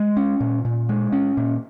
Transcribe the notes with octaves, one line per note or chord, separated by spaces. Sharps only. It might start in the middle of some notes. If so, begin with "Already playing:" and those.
Already playing: G#3
C#4
A#2
A#2
G#3
C#4
A#2